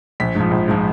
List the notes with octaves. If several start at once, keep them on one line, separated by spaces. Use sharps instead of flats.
A#1 B6
G#2
F3
A#1
G#2 F3